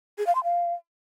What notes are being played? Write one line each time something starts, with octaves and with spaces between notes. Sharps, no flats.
G#4
F5
C6
F5